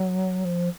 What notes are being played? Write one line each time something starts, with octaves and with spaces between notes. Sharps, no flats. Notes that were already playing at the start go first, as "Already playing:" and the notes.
Already playing: F#3
F3